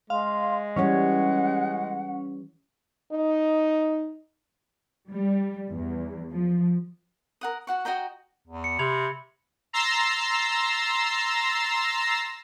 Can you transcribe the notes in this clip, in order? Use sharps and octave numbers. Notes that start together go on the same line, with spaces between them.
G#3 F5 C6
E3 G3 C#4 C#5 F#5
D#4
G3
E2
F3
A#4 F#5 D#6
F#4 F#5 C#6
F#4 D#5 G5 A#5
E2
C#7
C3 B5 G#6 F7
A#5 C6 E6 A6 A#6 C7